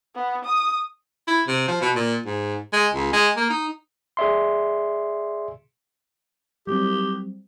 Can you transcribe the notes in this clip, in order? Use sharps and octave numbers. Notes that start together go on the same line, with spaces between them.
B3
D#6
E4
C3
F3
B2
A#2
G#2
G#3
C#2
G#3
A#3
D#4
G#4 D5 E5 C6
F#3 G3 C4 G4